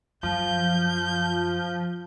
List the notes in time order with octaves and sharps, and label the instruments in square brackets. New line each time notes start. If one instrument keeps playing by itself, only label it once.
[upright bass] F#2 [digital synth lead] F3 [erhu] G6